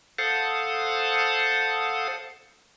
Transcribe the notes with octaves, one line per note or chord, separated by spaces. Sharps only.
A4 C5 F5 F#5 A5 D#6